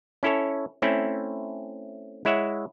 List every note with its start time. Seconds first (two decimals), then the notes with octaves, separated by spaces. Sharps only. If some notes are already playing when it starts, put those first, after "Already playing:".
0.23 C#4 E4 A4 C#5
0.82 A3 C4 C#4 E4
2.25 G#3 E4 C#5 E5 F#5